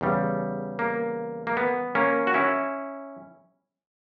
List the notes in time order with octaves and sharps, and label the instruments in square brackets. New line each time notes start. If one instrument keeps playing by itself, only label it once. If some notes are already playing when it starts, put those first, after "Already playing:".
[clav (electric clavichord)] E2 C#3 G3
A#3
A#3
B3
A#3 C#4
F#4
C#4 E4